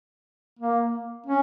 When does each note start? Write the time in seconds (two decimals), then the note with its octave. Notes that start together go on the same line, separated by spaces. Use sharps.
0.59 A#3
1.27 C#4